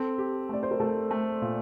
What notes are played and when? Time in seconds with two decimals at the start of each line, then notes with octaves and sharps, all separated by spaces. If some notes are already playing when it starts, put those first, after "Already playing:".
Already playing: C4 A4
0.18 G4
0.49 A3 D5
0.63 C5
0.71 A#4
0.80 A3 A4
1.11 A3
1.42 A#2